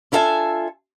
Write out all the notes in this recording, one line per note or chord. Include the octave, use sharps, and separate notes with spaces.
D4 E4 F4 A4 E5 G#5